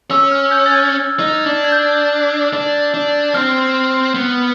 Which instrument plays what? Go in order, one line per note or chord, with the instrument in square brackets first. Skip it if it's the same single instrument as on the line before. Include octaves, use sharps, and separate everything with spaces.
[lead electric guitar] C#4 [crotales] E6
[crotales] F6
G6
A6
G#6
G#6
[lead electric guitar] D#4
D4
[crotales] G#6
G6
[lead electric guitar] D4
D4
[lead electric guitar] C4 [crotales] F6
[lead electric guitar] B3